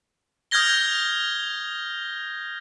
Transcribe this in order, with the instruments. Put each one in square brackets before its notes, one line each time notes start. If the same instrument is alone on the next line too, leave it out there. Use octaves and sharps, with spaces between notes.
[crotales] D#6 F6 G6 G#6 A#6 G7